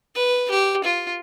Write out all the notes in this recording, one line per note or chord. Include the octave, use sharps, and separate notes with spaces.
B4
G4
F4